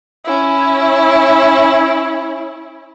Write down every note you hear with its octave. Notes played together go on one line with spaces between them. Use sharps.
C#4 E4